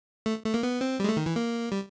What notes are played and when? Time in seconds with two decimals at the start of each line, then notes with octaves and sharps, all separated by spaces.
0.26 A3
0.45 A3
0.54 A#3
0.63 B3
0.81 C4
1.00 G3
1.04 G#3
1.09 A3
1.17 D#3
1.26 E3
1.36 A#3
1.72 G3